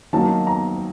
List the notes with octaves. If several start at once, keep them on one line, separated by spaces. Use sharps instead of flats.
D#3 F#3 A#3 D#4 A5
A#5